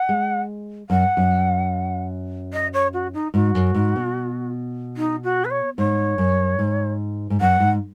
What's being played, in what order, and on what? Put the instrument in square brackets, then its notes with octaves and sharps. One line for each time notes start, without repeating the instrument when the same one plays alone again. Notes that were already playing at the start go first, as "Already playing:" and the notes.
Already playing: [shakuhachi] F#5
[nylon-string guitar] G#3
[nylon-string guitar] F#2 [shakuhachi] F#5
[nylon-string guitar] F#2
[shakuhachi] D#5
C#5
F#4
D#4
[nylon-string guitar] G#2 [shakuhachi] F#4
[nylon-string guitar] F#2
G#2
B2
[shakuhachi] D#4
F#4
B4
C#5
[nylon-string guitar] G#2 [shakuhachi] C#5
[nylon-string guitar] F#2
G#2
G#2
[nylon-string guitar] F#2 [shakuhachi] F#5
[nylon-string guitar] G#2